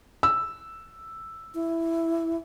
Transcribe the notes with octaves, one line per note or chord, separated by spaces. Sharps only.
E6
E4